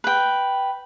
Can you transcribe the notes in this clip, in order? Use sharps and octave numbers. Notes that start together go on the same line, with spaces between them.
B4 G5